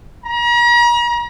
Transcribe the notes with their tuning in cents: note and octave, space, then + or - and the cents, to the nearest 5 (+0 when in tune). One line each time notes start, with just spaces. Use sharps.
A#5 +40